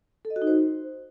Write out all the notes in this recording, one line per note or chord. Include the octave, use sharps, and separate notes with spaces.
A4
D#5
F#4
D#4
C5